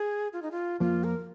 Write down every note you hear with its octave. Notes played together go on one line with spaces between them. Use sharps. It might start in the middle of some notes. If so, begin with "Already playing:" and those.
Already playing: G#4
F4
D#4
F4
F2 F3 A#3 F4
A#4